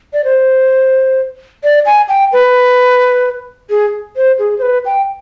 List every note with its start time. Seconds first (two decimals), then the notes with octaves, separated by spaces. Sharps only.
0.13 D5
0.24 C5
1.64 D5
1.86 G#5
2.09 G5
2.33 B4
3.70 G#4
4.16 C5
4.39 G#4
4.59 C5
4.62 B4
4.86 G5